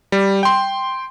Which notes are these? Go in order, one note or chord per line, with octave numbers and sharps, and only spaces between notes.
G3
G5 C6